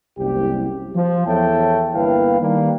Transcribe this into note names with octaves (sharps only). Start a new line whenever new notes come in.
F#1 C2 G4
F3
E2 A4 C#5 E5 G5 A5
G1 A#3 E4 B4 F5 G5
D#3 G3 A#3